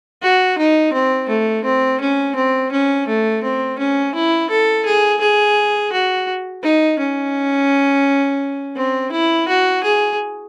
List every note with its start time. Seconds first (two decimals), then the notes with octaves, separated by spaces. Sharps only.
0.23 F#4
0.59 D#4
0.93 C4
1.29 A3
1.65 C4
2.01 C#4
2.36 C4
2.72 C#4
3.08 A3
3.43 C4
3.79 C#4
4.15 E4
4.50 A4
4.86 G#4
5.21 G#4
5.93 F#4
6.63 D#4
6.99 C#4
8.76 C4
9.12 E4
9.48 F#4
9.84 G#4